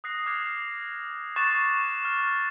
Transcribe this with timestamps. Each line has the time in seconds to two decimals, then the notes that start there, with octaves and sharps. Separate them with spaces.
0.04 D#6 F#6 A#6 C7
0.26 D6 F6 F#6 G#6 C7 F7
1.36 C#6 D6 F#6 A6 C7 E7
2.05 F6